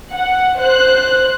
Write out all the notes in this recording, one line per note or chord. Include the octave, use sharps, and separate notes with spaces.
F#5
C5 F#6